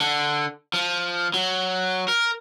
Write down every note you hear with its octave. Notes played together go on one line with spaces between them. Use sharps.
D3
F3
F#3
A#4